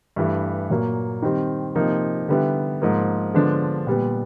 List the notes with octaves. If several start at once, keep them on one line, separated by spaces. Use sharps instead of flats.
G2 E3 A3
A#2 F#3 A#3
D#3 G3 C4
C3 F3 A#3 D#4
D3 G3 B3 E4
G#2 F3 A#3
D3 F3 G#3 B3 D4
A#2 G3 B3